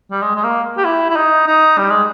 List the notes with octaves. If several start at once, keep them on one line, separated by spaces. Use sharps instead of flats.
G3
G#3
G#3
A#3
G4
E4
E4
D#4
D#4
G3
G#3